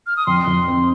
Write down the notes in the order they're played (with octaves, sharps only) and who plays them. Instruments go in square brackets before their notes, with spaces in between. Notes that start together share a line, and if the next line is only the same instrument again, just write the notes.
[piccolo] F6
D#6
[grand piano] F2 [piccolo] C6
[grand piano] F2
C4